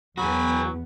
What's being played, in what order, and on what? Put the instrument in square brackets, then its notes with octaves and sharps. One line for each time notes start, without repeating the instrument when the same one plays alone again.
[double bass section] E2 B3 [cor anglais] F#3 [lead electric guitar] F#4 G#4 [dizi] B5